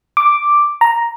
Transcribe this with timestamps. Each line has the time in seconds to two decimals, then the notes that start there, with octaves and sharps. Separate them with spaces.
0.17 D6
0.81 A#5